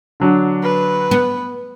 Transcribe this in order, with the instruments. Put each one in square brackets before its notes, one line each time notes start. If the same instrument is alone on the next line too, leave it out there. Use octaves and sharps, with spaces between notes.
[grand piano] D3 F#3 D4
[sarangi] B4
[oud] B3